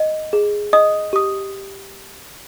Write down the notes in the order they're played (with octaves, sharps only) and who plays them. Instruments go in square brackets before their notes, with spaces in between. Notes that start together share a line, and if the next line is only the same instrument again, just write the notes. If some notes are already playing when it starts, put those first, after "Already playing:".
Already playing: [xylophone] D#5
G#4
D#5 D#6
G4 D#6